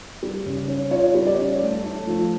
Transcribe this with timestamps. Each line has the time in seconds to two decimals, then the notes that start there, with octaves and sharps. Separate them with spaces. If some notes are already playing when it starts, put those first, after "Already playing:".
0.23 G3
0.46 C#3
0.68 C#4
0.91 F4 C#5
1.14 G3
1.26 D5
1.38 C#4
1.62 A3
1.84 A3
2.07 F3